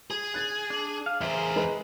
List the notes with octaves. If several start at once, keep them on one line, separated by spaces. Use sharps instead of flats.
G#4
F#6 A6
D4
F5
E2 G#4 A#4 C5 E5
G#3 B4